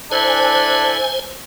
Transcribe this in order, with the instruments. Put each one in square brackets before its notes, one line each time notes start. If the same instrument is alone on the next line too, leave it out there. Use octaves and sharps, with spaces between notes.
[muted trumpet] D4 [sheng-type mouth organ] E4 A4 F#6 [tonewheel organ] C5 G#5